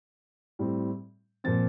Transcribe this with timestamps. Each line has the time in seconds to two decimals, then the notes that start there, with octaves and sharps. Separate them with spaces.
0.59 A2 G3 C4
1.44 A#2 F3 C4 A6